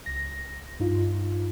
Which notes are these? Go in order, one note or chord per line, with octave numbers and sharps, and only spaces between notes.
C#2 A#6
G2 D#4 F4